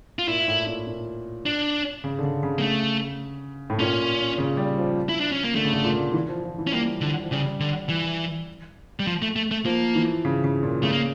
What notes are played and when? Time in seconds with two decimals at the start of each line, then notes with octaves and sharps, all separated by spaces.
0.19 F4
0.28 A#2 E4
0.48 A2
0.67 A#2
0.87 A#2
1.46 D4
2.04 C#3
2.19 D3
2.23 C#3
2.43 C#3
2.59 A#3
2.62 A3
3.70 A2
3.79 A#2 C#4
4.38 C#3
4.57 G3
4.78 F3
5.09 E4
5.20 D4
5.32 C#4
5.43 A#3
5.55 D3 A3
5.65 C#3
5.74 D3
5.84 A#2
6.13 E3
6.29 F3
6.43 F3
6.58 E3
6.67 C#4
6.72 G3 A#3
7.01 D3
7.24 F3
7.31 C#3 G3
7.60 D3
7.89 E3
8.99 G3
9.07 F3
9.22 A3
9.36 A3
9.51 A3
9.65 F3 A#3
9.95 E3
10.25 C#3
10.44 C#3
10.63 A#2
10.83 C#3 A3
10.92 A#3